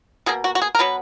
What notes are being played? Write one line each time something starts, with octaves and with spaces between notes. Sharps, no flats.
B2 A#3 G#4
F#4
F#4
G#4
A#4
B2 F#3 B3 B4